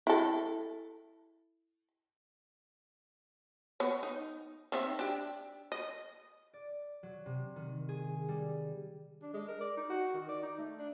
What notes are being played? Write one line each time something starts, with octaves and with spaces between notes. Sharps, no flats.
E4 A4
B3 C#5
D#4
D#3 C4 E5
D4 G4
D#5
D5
F#3
C3
D#3
G#4
G3
D4
G#3
A#4
D5
D#4
F#4
D#3
D5
D#4
A3
D4